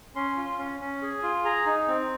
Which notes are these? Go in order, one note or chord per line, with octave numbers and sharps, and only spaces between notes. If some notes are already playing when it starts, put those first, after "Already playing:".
C#4 C6
F4
C#4
C#4
G#4
F4
G#4 A#5
D#4
C4